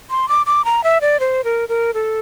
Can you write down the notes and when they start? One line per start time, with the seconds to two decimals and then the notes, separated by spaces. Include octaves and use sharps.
0.10 C6
0.29 D6
0.46 D6
0.65 A#5
0.84 E5
1.01 D5
1.20 C5
1.44 A#4
1.69 A#4
1.94 A4